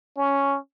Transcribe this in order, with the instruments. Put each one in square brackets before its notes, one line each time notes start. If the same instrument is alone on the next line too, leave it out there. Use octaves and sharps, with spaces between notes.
[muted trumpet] C#4